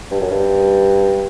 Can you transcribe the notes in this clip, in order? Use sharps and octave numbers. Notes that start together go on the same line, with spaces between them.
G2
F#2
G2